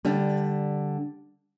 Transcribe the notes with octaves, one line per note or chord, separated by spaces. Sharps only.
D3 G3